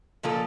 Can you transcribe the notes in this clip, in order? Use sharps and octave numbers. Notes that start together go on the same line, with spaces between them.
A#2 F3 A#3 F4 A4